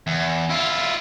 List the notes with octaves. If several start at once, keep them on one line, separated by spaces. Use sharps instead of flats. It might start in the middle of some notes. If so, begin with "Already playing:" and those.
E2
E4 F4